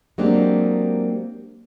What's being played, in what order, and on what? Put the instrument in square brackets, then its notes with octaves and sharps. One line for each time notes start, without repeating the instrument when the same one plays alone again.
[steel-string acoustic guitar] F#3 G#3 A#3 C4 D4 G4